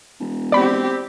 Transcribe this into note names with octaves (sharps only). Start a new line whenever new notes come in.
E1
C4 G4 D5 B5